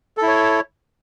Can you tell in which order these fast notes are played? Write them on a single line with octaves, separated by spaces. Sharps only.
A4 E4 C#5